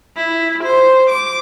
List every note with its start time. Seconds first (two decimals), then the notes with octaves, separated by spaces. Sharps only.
0.17 E4
0.63 C5
1.09 D6